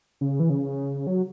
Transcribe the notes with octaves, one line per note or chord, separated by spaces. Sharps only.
C#3
E3
C#3
F#3